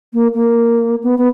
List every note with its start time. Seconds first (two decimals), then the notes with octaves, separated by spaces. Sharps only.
0.13 A#3
0.34 A#3
1.03 B3
1.18 B3